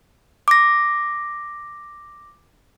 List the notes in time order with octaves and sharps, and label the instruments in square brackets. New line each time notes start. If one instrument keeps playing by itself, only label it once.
[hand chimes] D6 A#6